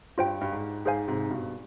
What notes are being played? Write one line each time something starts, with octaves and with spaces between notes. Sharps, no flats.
G2 F4 C5 G5
G2
G#2
G#2 G#4 C5 F5 G#5
G#2 C3
G2 B2